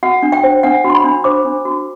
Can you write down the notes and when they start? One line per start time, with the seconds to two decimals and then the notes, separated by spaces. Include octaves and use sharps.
0.03 F#4 F#5
0.23 D4
0.32 G5
0.44 C5
0.63 D4 F#5
0.84 F#4
0.90 C6
0.95 B5
1.04 D4
1.24 C5 D6
1.45 D4
1.65 F#4